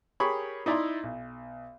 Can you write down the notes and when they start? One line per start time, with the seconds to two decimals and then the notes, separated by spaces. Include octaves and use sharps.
0.20 G4 G#4 A#4 C#5 B5 C#6
0.66 D#4 E4 D5 E5 A#5 C6
1.03 B1